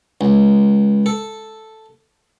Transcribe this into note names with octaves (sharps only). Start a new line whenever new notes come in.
C#2
A4